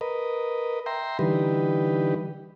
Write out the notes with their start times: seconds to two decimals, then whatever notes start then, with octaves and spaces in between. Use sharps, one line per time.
0.01 A#4 B4 D#5
0.86 E5 G5 A#5 C6
1.19 D3 E3 G3 D#4 G4 B4